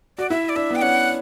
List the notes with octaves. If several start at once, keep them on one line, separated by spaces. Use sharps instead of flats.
F#4 D5
E4 E5
D5
D4 E5
B3 G5
C#4 F#5